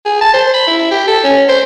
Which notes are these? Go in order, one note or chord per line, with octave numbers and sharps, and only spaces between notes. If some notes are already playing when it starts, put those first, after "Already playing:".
G#4
A5
C5
B5
E4
G4
A4
C#4
C5